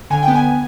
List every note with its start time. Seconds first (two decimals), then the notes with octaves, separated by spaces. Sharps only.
0.10 D3 G#5
0.23 G5
0.28 B3
0.35 G#5